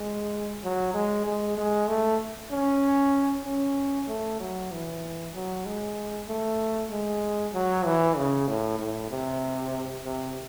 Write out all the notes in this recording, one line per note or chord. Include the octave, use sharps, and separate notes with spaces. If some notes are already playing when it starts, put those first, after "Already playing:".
Already playing: G#3
F#3
G#3
G#3
G#3
A3
C#4
C#4
A3
F#3
E3
F#3
G#3
A3
G#3
F#3
E3
C#3
A2
A2
C3
C3